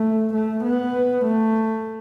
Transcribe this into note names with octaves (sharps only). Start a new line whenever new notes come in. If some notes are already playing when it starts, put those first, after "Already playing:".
Already playing: A3
A3
B3
A3